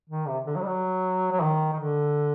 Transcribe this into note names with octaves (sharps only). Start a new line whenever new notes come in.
D#3
C3
D3
F#3
G3
F#3
F#3
D#3
D#3
D3